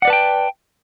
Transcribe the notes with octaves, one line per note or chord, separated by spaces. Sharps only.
B4 D5 F#5 G5 A5